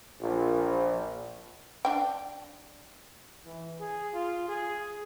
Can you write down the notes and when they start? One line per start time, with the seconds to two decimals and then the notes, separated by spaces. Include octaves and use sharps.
0.22 A#1
1.85 D4 G5
3.46 E3
3.80 G#4
4.14 F4
4.48 G#4